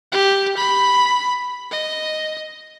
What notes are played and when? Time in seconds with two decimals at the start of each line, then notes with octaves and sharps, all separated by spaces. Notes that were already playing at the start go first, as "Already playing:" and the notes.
0.12 G4
0.57 B5
1.71 D#5